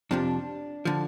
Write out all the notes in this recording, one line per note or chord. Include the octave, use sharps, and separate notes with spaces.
F2 C3 F3 D4
D3 F3